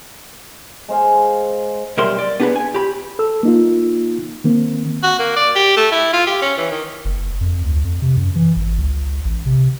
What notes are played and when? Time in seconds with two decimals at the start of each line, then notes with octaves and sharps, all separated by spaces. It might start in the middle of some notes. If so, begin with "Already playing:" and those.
0.88 G#3 C5 F5
1.97 B1 G3 A#4 E5 C6
2.19 D5
2.40 B3 D4 G4 G#4 B4
2.56 G#5
2.74 G4 B5
3.19 A4 E6
3.43 A#3 D#4 F4
4.44 D#3 A#3 C4
5.03 F#4
5.19 A#3
5.37 D5
5.55 G4
5.77 A3
5.92 E4
6.13 F4
6.27 G4
6.42 C#4
6.57 E3
6.71 D#3
7.05 F#1
7.41 F2
7.64 D2
7.84 F2
8.02 C3
8.17 F#2
8.35 E3
8.56 G#1
8.78 C#2
9.25 A1
9.46 C3